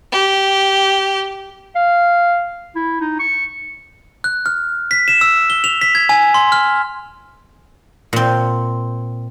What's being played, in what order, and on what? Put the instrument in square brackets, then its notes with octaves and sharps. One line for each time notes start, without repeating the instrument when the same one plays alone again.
[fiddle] G4
[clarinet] F5
E4
D#4
C#6
[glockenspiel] F#6
F6
B6
E7
E6
G7
F7
B6
G#6
G#5
C6
F6
[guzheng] A#2 C4